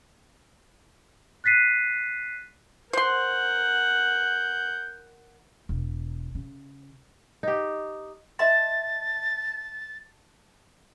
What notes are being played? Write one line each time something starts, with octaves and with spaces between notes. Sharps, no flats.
F#6 A6 B6 C7 D#7
A#4 C5 F#5 C6 G6
E1
C#3
D#4 G4
D#5 E5 A5 C6 A6